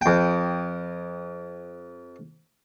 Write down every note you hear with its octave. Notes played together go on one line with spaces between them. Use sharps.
F2 G5